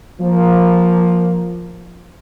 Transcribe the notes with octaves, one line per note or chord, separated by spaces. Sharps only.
F3 A#3